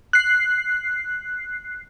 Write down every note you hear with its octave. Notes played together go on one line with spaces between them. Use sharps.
F#6 C7